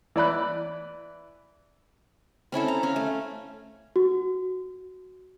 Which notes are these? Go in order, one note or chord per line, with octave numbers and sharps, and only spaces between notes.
E3 D5 B5 F#6
C4 C#4 E4 A4
A#5
C#4 F5
A3
F#4